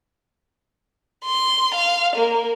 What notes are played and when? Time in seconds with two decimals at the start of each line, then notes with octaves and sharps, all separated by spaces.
1.25 C6
1.74 F5
2.16 A#3